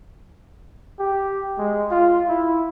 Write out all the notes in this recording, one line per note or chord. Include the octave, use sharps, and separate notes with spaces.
G4
G#3
F4
E4